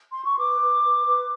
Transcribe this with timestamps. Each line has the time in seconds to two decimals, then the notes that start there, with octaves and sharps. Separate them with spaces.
0.11 C6
0.24 C#6
0.38 B4 D6
0.61 B4
0.83 B4
1.06 B4